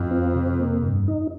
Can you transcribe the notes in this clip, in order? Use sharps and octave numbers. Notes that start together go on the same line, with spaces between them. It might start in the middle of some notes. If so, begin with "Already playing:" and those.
Already playing: F2 F4
C4
C3
A#3
G2
D#4